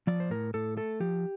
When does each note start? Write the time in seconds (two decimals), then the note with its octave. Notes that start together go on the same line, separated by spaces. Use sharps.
0.07 F3 D5
0.20 C5
0.30 A2 A#4
0.54 A2 A4
0.77 A3 A4
1.00 F3 G4